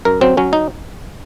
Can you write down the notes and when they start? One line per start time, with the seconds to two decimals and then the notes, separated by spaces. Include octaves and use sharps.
0.05 F#2 A#4
0.21 F#3 C4
0.37 F#3 C#4
0.53 D#4